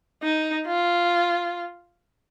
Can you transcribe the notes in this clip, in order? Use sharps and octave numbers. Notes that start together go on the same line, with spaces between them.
D#4
F4